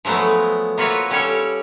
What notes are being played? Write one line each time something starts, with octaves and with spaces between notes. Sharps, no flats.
F3 F#3 G#3 A3 B3
A#3 F4 F#4 B4 C#5 E5
G3 C#4 G4 A4 C#5